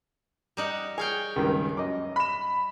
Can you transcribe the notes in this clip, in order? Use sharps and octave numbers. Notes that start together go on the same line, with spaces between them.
G3 D#4 F#5
G#4 C#5 F5 G5
C#2 G2 D#3
F#2 D#5 D6
B5 E7